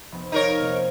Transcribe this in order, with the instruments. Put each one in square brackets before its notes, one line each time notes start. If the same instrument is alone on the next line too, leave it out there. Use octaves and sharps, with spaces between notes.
[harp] F1 B3 G5
[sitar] D#4 A#4 C#5 [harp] F5 C7 D#7
[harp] C3 A#3